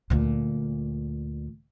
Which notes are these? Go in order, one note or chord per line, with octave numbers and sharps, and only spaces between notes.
D2 A#2